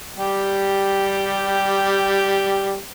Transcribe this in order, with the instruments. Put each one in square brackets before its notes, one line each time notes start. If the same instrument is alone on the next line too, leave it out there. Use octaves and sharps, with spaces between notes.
[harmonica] G3 G4